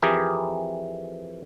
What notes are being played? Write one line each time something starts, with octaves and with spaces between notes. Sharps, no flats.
F2 E3 G4 G#4 A#4